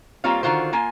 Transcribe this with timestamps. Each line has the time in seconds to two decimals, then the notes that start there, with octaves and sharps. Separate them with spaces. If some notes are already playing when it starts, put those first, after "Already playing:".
0.24 G3 A#3 C4 F4 C#5 F5
0.43 D3 D#3 F4 F#4 C5
0.73 A#3 F4 G#5